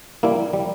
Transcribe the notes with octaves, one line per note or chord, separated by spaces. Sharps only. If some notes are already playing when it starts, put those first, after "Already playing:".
G3 A#3 E4
G3